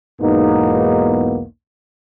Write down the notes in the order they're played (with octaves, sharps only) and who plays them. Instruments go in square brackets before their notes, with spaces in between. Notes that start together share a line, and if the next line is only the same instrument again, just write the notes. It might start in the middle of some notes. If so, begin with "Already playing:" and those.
[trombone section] B1 E2 G#2 A#3 B3 D#4